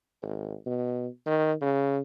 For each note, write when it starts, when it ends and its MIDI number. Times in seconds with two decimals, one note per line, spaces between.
0.22 0.54 32
0.66 1.08 47
1.26 1.53 51
1.61 2.00 49